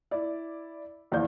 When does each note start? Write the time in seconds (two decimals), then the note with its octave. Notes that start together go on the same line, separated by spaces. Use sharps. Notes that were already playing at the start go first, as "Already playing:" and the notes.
0.11 E4 D5
1.12 A#1 E2 A#2 D5 F5 G6